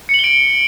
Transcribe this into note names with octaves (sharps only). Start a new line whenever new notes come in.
C#7 D7 F#7 G7